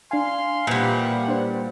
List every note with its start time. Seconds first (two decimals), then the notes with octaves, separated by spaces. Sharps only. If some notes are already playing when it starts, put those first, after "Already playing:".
0.11 D4 F5 G#5 C6
0.67 A#2 E3 F3 G3 F#5
1.28 D4 C5